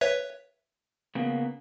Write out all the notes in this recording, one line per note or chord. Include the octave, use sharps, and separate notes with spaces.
B4 C#5 E5
C#3 A#3 B3